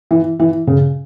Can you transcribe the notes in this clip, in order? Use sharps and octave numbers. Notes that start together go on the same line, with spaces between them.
E3
E3
C#3